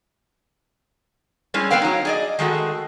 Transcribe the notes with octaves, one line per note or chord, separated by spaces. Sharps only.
G3 G#3 C#4 E4
B3 C4 B4 F5 G5
F#3 D#4
G#4 D5 D#5
D#3 G#3 A3 F#4